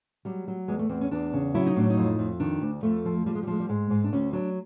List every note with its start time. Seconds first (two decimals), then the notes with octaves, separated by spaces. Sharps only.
0.25 F#3 G3
0.48 F#3
0.68 E2 G#3
0.79 A3
0.89 E2 C4
1.01 C#4
1.11 E2 D4
1.33 C#3
1.54 F#3 E4
1.66 D#4
1.76 A2 D4
1.90 D#4
1.97 F2
2.19 F2
2.40 D#3 D4
2.62 D2
2.83 F2 A3
3.05 F3
3.26 F3 G3
3.35 G#3
3.43 G3
3.47 F3 G#3
3.60 G3
3.69 G#2 G#3
3.90 G#2
4.04 D4
4.12 D2 C#4
4.33 F#3 D4